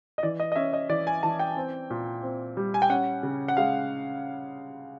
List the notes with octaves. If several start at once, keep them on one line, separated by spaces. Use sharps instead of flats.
D#5
E3 D5
D#5
D#5
C#4 E5
D#5
E3 D5
G#5
E3 A5
G5
C4
A#2
C4
G3
G#5
G5
C#4 F#5
C#3
F#5
G#3 F5